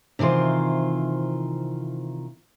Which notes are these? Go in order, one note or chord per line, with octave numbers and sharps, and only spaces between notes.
C3 D#3 E3 F4 C5